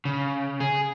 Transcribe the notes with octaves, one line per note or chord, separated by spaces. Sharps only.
C#3
G#4